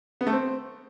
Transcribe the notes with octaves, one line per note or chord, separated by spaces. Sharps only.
B3
A3
C4